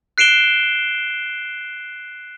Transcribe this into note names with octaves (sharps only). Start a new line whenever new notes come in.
F#6 C7 D7 E7 G7